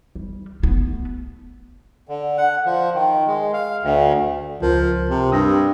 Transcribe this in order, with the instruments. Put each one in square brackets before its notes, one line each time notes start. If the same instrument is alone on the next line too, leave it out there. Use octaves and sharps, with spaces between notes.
[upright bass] G3
A3 B3
[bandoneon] D3
F#5
F3
D#3
G#3
F5
D2
[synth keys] C#2 A#4 [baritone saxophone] F3
[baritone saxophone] C3
[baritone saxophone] G2 [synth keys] D#6 E6 A#6